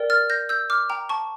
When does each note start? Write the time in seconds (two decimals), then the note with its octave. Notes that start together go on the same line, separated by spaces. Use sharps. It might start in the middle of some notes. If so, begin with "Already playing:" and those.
Already playing: A#4 D5 G5
0.10 F6 A6
0.30 G6 A#6
0.49 E6 G6
0.70 D6 F6
0.90 G5 A#5
1.09 A5 C#6